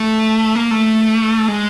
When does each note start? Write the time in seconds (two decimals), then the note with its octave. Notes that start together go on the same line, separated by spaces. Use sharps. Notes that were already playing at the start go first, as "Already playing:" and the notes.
Already playing: A3
0.55 A#3
0.71 A3
1.48 G#3